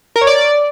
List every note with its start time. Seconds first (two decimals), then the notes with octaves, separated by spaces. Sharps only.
0.16 A#4
0.21 C#5
0.27 D5